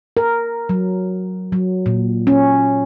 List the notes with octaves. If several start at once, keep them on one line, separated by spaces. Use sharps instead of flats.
A#4
F#3
F#3
A#2
C#4